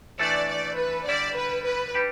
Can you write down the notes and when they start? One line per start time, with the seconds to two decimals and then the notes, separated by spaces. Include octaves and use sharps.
0.19 E3 A3 D4 A4 D5
0.49 D5
0.77 B4
1.07 D3 G3 E4 D5
1.36 B4
1.65 B4
1.94 G3 D4 G4